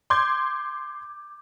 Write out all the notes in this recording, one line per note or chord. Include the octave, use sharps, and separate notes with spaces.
C6 D6 G6 G#6